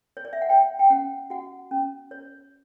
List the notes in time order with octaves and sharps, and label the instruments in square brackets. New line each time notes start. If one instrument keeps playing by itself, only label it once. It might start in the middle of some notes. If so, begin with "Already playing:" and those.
[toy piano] C#5
D5
E5
F#5
C#5 G5
G5
C#4 F#5
F#4 F#5
C#4
C#5